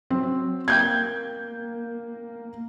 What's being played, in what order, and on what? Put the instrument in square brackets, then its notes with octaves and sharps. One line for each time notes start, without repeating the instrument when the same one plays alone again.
[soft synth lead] F#3 [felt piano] C4
[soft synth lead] A#3 [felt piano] G5 G6 G#6